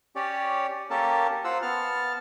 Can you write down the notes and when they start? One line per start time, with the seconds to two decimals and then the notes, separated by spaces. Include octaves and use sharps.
0.16 C#4 G4 C#5 D5
0.90 A#3 C#4 G4 A4 A#4 A5
1.44 F4 C5 F#5 E6
1.62 B3 A5 F6